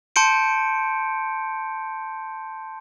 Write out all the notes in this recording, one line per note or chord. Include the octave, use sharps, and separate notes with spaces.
A5 C6 G6 C#7 D7